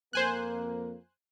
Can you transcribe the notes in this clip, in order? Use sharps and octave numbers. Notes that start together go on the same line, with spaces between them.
F2 A#3 C5 G#5 F#6